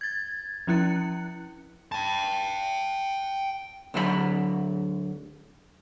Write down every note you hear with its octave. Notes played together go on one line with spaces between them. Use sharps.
G#6 A6
F3 C#4 E4 F#6 C#7
G5 A5
D2 D3 F#3 D#5 B5